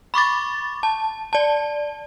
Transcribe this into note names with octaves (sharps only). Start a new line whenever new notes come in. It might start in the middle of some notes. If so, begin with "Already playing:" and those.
B5 C#6 D6 A6
A5
D5 A5